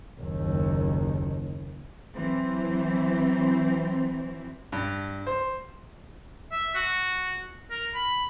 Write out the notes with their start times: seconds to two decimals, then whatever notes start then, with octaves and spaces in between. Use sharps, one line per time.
0.19 F#1 D#2
2.14 E3 F#3 C4
4.72 G2
5.27 C5
6.52 E5
6.75 F#4
7.71 A#4
7.95 B5